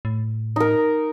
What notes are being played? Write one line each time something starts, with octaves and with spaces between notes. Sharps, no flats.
A2
D#4 A#4